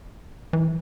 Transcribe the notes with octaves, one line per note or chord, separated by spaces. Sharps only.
E3